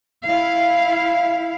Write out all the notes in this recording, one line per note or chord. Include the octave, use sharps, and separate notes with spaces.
E4 F5